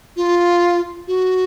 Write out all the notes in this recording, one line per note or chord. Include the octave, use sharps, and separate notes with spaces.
F4
F#4